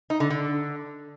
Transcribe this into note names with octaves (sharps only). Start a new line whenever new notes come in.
D#4
D3
D3